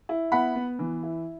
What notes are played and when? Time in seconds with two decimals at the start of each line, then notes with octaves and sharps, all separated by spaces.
0.09 E4
0.32 B3 F#5 B5
0.55 B3
0.79 E3
1.03 E4